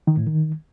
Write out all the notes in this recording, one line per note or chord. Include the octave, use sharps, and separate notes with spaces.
D#3
A2
D#3